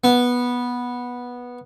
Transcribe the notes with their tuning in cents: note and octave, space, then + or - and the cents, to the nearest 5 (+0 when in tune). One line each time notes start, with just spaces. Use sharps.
B3 -10